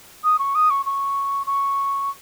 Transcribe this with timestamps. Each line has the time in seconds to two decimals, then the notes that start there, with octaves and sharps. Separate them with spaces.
0.24 D#6
0.39 C#6
0.55 D#6
0.70 C#6
0.85 C#6
1.46 C#6